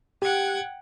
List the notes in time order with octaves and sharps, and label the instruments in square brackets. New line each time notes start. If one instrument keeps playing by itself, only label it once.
[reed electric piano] G4 [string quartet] F#5 G5 G#6